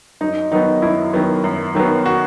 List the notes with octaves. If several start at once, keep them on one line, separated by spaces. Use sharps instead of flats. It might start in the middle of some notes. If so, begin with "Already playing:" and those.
F#2 D#4
D#3 F#3 B3 D#4
F#2 E4
D#3 F#3 B3
F#2
D#3 F#3 B3
F#4